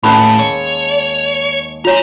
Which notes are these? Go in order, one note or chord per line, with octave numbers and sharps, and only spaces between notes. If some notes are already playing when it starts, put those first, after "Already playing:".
D#2 A2 G#3 C#4 A5 B5
C#5
F4 C#5 G#5 A#5